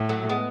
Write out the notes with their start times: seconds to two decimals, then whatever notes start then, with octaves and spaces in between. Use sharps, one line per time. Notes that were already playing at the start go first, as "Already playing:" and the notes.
Already playing: A2
0.09 F#3 A3
0.29 G#3 B3